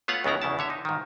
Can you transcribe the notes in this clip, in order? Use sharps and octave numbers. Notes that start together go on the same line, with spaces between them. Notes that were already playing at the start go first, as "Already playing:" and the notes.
A3 B3 F4 C#5 F5 F#5
C#2 C#3 B3 E4 A#5
E2 C#3 E4 A5
D3 C#5 E5
D#4
G#2 D#3